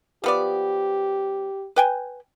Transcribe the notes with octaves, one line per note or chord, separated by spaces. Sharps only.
F3 B3 G4 D5
B4 G5 G#5